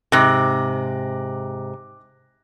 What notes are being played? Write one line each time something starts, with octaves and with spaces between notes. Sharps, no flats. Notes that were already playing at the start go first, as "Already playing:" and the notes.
G#2 C3 D6 F#6 A#6